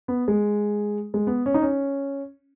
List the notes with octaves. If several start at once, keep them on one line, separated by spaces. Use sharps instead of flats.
B3
G#3
G#3
B3
C#4
D#4
C#4